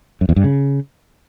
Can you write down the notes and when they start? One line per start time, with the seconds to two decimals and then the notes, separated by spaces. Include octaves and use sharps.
0.21 F#2
0.29 E2
0.36 G2
0.44 C#3